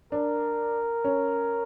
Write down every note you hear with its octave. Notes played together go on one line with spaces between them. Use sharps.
D4 A#4
C#4